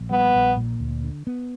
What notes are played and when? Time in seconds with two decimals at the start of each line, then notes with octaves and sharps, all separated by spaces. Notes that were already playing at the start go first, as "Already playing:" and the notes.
Already playing: A#1
0.11 G3 B3
0.34 A#1
0.57 A#2
0.80 D2
1.03 D3
1.27 B3